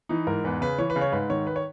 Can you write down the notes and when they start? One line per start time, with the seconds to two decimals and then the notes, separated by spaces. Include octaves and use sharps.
0.09 E3 D#4
0.27 G#2 A#4
0.44 E2 B4
0.61 C#3 B4
0.78 E3 C#5
0.90 B4
0.96 C#3
1.01 C#5
1.12 G#2 B4
1.30 D#3 C#5
1.47 B4
1.56 C#5